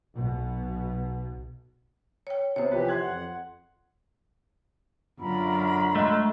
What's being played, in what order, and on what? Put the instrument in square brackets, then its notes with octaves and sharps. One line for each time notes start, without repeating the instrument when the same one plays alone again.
[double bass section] B1 B2
[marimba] C#5 G5
[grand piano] C3 B3 [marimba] C5 C#5
[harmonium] E3 G4 [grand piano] F3 B4
[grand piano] C6 F#6 G#6
[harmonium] F2 F#5
[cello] F#2 D3 [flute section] F4 A#5 B5
[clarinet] G#3 [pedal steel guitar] A3